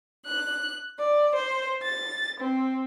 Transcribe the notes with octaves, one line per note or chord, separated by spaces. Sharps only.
F#6
D5
C5
A6
C4